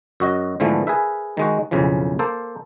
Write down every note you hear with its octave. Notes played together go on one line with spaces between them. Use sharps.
F#2 F#4 D#5
G#2 D3 E3 F3 A3 B3
G#4 A#4 B4 E5
D#3 G#3 F#4
B1 F2 C#3 E3 F3
A#3 A4 C5